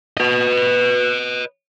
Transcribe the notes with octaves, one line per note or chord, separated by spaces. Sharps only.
B4 D#5